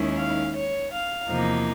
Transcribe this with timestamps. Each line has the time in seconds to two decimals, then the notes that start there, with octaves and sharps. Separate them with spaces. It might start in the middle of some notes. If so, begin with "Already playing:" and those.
Already playing: D#2 D#3 G#3 C#4 E4
0.18 F5
0.55 C#5
0.92 F5
1.29 E2 C3 F3 A#3 D#4